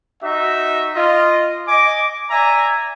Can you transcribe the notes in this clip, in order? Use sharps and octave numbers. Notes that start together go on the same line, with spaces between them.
D#4 F#4 E5
F4 D#5
D#5 G#5 D6
D5 E5 G#5 A#5